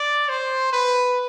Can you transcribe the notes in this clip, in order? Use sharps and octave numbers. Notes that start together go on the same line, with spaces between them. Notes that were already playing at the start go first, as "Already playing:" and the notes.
Already playing: D5
C5
B4